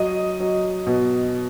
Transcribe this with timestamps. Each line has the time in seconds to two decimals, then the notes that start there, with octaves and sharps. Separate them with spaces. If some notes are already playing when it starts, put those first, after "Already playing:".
Already playing: F#3 D#5
0.40 F#3
0.86 B2